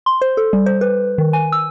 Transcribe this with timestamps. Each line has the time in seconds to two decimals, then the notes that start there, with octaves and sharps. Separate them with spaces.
0.06 C6
0.22 C5
0.37 A4
0.53 G3
0.66 C5
0.81 B4
1.18 D#3
1.33 G#5
1.52 E6